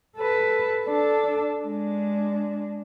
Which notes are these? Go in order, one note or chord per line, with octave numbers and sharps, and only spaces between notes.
A4 B4
D4 A4
G#3 D4